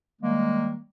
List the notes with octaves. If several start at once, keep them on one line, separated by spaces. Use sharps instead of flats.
D#3 G3 G#3 A#3